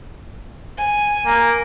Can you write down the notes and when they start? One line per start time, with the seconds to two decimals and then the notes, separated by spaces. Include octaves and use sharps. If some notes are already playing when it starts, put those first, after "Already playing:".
0.77 G#5
1.26 A#3